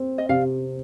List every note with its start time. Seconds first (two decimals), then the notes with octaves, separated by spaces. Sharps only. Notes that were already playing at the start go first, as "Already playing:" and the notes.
Already playing: C4
0.18 D#5
0.29 C3 D5 F5